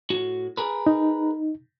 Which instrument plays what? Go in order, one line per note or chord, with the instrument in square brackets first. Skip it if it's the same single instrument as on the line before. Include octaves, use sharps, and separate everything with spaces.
[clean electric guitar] A2 F#4
G#4 A#4 B4
[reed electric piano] D#4